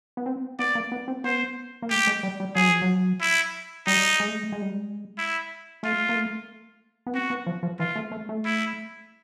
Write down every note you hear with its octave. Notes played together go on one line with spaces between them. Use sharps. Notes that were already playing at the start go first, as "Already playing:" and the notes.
B3
C4
B3 D5
A#3
B3
C4
B3 C5
A#3
A3 G4
G#3
G3
G3
F#3 G#4
F3
F#3
E4
G3 D#4
G#3
A3
G#3
G#3
G3
G#3
E4
A3 F4
A#3
A3
B3
C4 F#4
B3
F3
F3
E3 F4
A3
A3
A3
E4